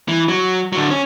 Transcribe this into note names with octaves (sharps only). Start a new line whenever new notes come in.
E3
F#3
D3 F#3
C#4